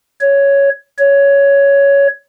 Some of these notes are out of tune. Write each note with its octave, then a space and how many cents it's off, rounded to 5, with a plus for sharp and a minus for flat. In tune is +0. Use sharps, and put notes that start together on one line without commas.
C#5 +5
C#5 +10